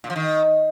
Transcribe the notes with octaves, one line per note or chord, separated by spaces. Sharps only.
A#2
F3
D#3